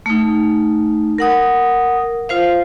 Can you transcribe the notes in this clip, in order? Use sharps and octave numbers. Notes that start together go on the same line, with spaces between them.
A3 D#4
A#4 F#5 D#6
F4 C5 F5